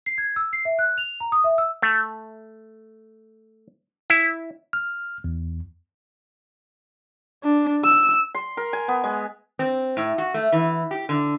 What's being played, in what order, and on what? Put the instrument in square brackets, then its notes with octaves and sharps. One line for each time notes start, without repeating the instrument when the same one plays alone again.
[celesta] C7
G#6
E6
C7
E5
F#6
F7
A#5
D#6
E5
E6
[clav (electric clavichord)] A3
E4
[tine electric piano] F6
E2
[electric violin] D4
E6
[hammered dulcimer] C6
A#4
G#5
B3
G#3
[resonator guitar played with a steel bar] C4
A2
F#4
A3
E3
G4
D3